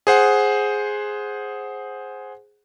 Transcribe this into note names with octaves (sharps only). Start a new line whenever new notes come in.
G#4 C5 F#5